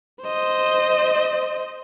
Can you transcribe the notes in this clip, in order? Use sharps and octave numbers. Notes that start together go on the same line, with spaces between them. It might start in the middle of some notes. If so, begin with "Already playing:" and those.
C5 D#5